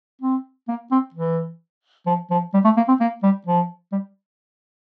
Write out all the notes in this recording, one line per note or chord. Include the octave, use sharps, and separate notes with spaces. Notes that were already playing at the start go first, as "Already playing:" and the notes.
C4
A#3
C4
E3
F3
F3
G3
A3
A#3
C4
A#3
G3
F3
G3